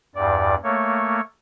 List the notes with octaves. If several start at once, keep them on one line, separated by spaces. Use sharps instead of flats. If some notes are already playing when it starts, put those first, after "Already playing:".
E2 G2 D5
A3 A#3 C#5